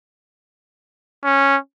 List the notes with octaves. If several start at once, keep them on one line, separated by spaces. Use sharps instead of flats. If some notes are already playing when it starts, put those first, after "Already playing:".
C#4